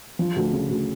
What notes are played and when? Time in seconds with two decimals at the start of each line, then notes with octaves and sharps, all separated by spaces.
0.19 F3
0.36 D2
0.53 C#3
0.69 D2